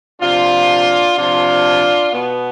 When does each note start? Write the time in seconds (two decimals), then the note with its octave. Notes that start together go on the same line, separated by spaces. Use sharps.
0.20 C3 F3 D4 F4
1.16 C3 F3 D4 F4
2.13 B2 B3